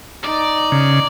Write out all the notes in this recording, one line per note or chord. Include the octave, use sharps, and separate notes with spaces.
D#4 D5
C#3